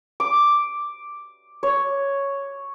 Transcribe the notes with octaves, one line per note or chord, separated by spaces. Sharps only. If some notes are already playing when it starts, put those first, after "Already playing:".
D6
C#5